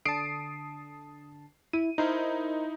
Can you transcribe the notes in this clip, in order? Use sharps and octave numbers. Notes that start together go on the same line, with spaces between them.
D3 A5 D#6 C7 D7
E4 D#7
D#4 E4 A#4 C5